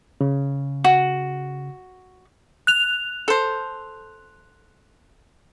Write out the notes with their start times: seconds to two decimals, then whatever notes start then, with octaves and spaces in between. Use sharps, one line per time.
0.21 C#3
0.84 F#4
2.67 F#6 F7
3.28 A4 C5